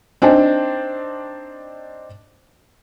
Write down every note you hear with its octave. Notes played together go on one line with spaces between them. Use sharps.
C4 D4 D#4 G5